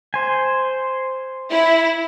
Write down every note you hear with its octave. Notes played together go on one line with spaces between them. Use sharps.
C5 G#5
E4